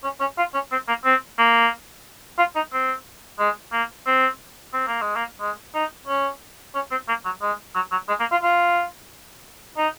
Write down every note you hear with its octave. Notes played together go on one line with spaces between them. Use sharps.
C#4
C#4
F4
C#4
C4
A#3
C4
A#3
F4
D#4
C4
G#3
A#3
C4
C4
A#3
G#3
A#3
G#3
D#4
C#4
C#4
C4
A#3
F#3
G#3
F#3
F#3
G#3
A#3
F4
F4
D#4